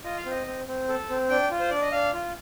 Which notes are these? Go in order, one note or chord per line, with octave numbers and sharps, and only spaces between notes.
F4 D#5
F5
C4
D#5
C4
C4
A4
C4
D4 G5
F4
C5
D4 D5
D#5
D4 F5
F4